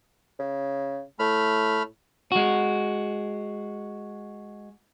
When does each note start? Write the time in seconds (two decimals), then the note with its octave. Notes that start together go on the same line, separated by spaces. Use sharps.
0.39 C#3
1.19 A2 A3 B5 F6
2.32 G#3 F#4